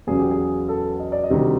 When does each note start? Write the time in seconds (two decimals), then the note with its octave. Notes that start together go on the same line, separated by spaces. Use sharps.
0.07 E2 C#3 F#3 G#4
0.19 G4
0.31 G#4
0.68 A4
1.00 D#5
1.12 D5
1.24 D#5
1.30 D2 C3 D#3 G3